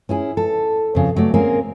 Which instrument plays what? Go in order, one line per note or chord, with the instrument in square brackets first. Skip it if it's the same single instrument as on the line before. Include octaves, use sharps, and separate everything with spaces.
[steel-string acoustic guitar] C#4 E4 G#4
A4
F2 C#3
F#3 A3 D5
A#3 C4 C#4 G#4 A#4